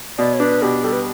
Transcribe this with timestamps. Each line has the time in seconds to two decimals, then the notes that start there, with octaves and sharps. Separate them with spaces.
0.18 B2 D5
0.34 C#5
0.40 D4 B4
0.62 B2 G4
0.84 G3 A4
0.93 B4